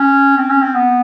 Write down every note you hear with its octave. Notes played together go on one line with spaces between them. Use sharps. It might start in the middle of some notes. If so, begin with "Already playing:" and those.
Already playing: C#4
C4
C#4
C4
B3